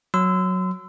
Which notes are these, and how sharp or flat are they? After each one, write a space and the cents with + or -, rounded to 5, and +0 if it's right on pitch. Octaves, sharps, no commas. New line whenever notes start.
F#3 -5 C6 -35 E6 +0